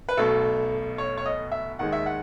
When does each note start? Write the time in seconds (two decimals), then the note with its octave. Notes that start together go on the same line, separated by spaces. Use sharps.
0.09 B4
0.17 B1 B2 A3 A4
0.98 C#5
1.17 C#5
1.26 D#5
1.52 E5
1.79 D#2 D#3 G#3 F#5
1.92 E5
2.06 F#5